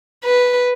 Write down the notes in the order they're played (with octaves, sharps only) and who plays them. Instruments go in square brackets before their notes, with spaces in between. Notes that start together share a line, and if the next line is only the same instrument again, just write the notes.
[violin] B4